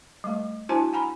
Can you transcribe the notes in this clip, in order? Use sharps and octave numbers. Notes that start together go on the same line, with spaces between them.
G3 A3
D4 E4 F#4 C5 G#5 A5
F#5 G#5 A#5 B5